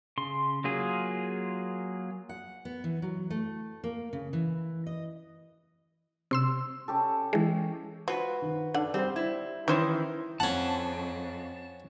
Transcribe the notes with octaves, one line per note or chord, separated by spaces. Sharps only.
C#3 C6
F#3 A#3 F4 G#4
F#5
B3
E3
F#3
A3
A#3
C#3
E3
D#5
C3 C6 E6
C#4 G4 A4
E3 G#3
F3 F#4 B4
D#3
D3 D4 F#5
G3 C4 C5
E4
D#3 E3 C#4 E4 C5 G#6
F2 C#4 F#5 A5